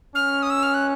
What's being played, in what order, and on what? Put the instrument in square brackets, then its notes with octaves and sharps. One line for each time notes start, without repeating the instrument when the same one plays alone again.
[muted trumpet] C#4 [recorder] F6
[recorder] D#6
E6
F6
F#6